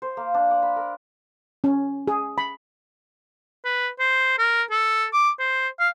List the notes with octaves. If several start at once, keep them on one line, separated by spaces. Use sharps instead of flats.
C5
A#3
D4
D5
B5
A#4
C#4
G#4
B5
B4
C5
A#4
A4
D6
C5
F5